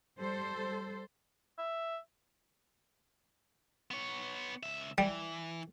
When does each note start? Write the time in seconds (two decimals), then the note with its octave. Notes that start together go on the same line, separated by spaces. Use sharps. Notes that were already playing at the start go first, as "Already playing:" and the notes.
0.19 G3 A4 C5
1.58 E5
3.91 B3 C#5
4.63 C#2 E5
4.98 E3 G3